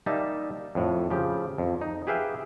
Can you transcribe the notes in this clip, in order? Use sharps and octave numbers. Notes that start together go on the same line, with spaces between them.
G3 A#3 D#4 E5 A5
F2 A2
C#3 F3 G4
F2
D#4
G4 G#4 B4 E5 F5 G5